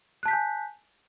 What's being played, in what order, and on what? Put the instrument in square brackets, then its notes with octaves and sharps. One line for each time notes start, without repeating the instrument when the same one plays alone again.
[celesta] F#6
A5
B6
G6
G#5